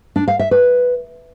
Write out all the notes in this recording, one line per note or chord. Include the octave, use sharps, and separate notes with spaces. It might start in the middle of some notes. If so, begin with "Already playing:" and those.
D4
F5
E5
B4